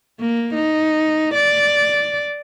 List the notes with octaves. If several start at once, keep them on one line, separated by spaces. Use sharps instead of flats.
A#3
D#4
D5